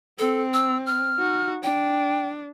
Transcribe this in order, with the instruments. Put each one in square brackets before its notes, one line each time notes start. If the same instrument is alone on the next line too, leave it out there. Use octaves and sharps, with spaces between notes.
[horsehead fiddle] C4 [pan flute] A4
[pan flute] E6
F6
[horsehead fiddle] D#4 F#4
[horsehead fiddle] D4 [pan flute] G5